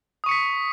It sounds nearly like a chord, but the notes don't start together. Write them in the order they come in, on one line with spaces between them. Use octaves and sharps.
D#6 C#6 C#7 B6